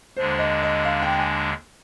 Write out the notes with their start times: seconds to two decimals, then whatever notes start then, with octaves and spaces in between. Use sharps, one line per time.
0.16 D#2 D3 G#3 D4 C5
0.39 D#5
0.62 D#5
0.85 F5
1.02 G5
1.19 G#5